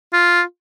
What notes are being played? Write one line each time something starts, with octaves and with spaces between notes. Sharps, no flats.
F4